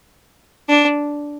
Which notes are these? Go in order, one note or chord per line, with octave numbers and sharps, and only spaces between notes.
D4